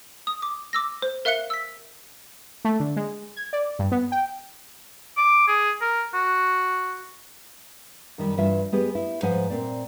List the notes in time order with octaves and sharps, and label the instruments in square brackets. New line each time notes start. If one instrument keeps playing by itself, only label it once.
[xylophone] D#6
D6
D6 E6 A#6
C5
A#4 E5 F5 F#6 C#7 G7
E6 B6
[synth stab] A3
D3
G#3
G#6
D5
G2
B3
G5
[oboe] D6
G#4
A#4
F#4
[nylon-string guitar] F#2 D#3 G3
G2 E3 F4 E5
G#3 B3 G4 G#4
E4
G#2 F3 B4 C5 F#5 G#5
A#2 C4 D5